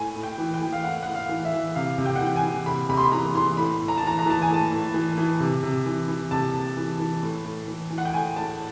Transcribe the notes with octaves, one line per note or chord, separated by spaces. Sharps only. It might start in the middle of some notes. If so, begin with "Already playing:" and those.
Already playing: A2 G#5
A2
G5
E3
G5
E3
F5
A2 F#5
A2 F#5
F5
E3
E5
E3
C3 F5
C3
G5
F#5
E3 G5
G#5
E3
C3 B5
C3 B5
C6
B5
E3 A#5
E3 C6
A2 B5
A2
A#5
A5
E3 A#5
A#5
E3 A5
G#5
A2 A5
A2
E3
E3
C3
C3
E3
E3
C3 A5
C3
E3
E3
A2
A2
E3
E3
F#5
G5
A2 G#5
A2 A5